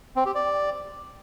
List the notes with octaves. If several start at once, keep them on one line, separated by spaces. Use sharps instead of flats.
C4
G4
D5